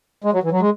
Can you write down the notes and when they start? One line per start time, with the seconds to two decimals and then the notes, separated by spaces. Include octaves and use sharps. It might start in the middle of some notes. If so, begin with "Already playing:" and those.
0.24 G#3
0.33 F#3
0.43 E3
0.52 F#3
0.61 G#3